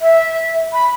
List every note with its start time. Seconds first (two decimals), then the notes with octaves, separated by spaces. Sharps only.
0.01 E5
0.73 B5